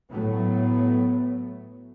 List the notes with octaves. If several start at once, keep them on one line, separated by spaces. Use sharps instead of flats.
A2 F#3 A3 B3